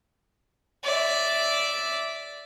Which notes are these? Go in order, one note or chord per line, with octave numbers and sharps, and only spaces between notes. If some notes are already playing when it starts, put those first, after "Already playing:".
D5 E5